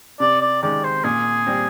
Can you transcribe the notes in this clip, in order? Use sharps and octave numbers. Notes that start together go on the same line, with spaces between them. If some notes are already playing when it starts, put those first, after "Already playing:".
C3 D5
D5
D#3 G#3 D5
C5
A#2 G#4
G3 C4